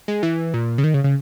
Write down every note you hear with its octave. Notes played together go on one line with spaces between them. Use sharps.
G#3
E3
A#2
C#3
D#3
C#3
C#3